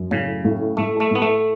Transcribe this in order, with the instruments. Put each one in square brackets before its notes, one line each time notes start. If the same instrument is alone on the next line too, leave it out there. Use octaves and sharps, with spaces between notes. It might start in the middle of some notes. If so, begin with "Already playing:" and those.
Already playing: [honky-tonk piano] F#2
[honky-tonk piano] A2 [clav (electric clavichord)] C#3
[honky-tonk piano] A2
[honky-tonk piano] A2 [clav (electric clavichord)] A3
[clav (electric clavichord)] A3
[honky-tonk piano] A2 [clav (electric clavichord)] B3
[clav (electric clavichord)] A3